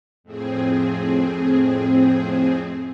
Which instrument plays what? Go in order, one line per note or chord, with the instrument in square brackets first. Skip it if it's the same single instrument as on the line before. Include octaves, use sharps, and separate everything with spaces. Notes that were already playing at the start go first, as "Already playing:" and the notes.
[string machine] F2 A2 C4 G#4